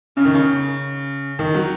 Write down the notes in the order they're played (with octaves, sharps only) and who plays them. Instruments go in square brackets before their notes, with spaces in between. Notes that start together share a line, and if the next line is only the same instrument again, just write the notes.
[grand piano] C#3 [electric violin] C#4
[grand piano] D#3
C#3
D#3
F#3